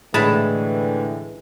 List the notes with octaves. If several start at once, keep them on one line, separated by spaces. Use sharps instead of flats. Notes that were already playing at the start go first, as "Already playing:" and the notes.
A2 D3 E3 G#3 A5 B5